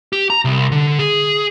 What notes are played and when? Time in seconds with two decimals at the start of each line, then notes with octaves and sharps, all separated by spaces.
0.13 G4
0.30 A#5
0.45 C2
0.72 D3
0.99 G#4